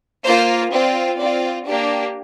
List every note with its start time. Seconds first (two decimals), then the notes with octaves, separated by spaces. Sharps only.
0.25 A#3 F4 C5
0.72 C4 F4 D5
1.19 C4 F4 D5
1.66 A#3 D4 G4